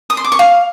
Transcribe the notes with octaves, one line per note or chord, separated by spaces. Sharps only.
D#6
C6
D6
C#6
F5